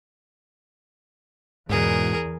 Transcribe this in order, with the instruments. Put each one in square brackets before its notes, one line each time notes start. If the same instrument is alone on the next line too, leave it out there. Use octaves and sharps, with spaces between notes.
[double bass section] E2 [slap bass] G#2 B2 [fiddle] G#4 A#4